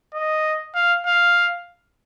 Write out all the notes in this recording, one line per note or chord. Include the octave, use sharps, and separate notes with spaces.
D#5
F5
F5